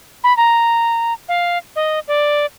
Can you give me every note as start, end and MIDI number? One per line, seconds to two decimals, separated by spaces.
0.24 0.35 83
0.37 1.13 82
1.29 1.58 77
1.76 1.99 75
2.08 2.46 74